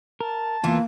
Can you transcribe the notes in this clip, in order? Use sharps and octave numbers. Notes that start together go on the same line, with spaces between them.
A#4 A5
E2 E3 A#3 F4